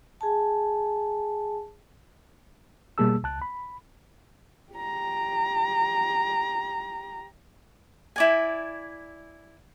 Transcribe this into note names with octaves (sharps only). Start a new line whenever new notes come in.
G#4 G#5 A5
B2 G3 A#3 G#4 A5 E6
C#2 A5 F#6
B5
G4 A#5
E4 D5 G#5